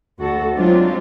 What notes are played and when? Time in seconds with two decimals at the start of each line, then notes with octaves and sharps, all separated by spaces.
0.19 D2 F#4 A4
0.55 F#3 G#3 C4 D4 D#4 F4